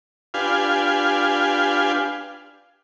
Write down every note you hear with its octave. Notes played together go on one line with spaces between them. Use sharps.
D4 F4 G4 B4 F5 G#5